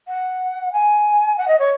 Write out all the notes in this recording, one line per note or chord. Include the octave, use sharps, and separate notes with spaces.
F#5
G#5
F#5
D#5
C#5